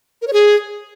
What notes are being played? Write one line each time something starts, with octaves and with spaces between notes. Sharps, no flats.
A#4
C#5
G#4